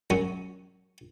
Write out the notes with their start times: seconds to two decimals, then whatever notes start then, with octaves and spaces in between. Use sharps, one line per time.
0.10 F#2 C#4 F#4